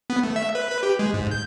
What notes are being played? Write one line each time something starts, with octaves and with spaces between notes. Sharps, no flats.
B3
A3
E5
B4
B4
G4
G#3
G#2
G6